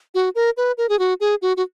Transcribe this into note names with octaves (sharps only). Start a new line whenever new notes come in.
F#4
A#4
B4
A#4
G#4
F#4
G#4
F#4
F#4